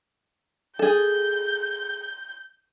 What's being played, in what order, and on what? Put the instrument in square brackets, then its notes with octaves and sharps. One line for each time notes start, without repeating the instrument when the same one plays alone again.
[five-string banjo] G#4 A4 [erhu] G6